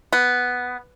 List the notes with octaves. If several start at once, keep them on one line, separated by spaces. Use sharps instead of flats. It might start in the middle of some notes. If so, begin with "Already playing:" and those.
B3